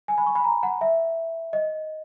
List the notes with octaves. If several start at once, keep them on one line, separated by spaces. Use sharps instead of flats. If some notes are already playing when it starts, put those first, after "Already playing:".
G#5
B5
C#6
B5
A#5
F#5
E5
D#5